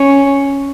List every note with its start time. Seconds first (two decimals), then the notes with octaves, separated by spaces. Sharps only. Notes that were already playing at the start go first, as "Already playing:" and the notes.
Already playing: C#4